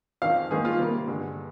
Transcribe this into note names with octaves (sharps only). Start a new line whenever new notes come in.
F2 D#3 G#3 F5
G#2 D#3 A#3 G#4
F4
C3 G3 A#3
G2 D3 G#3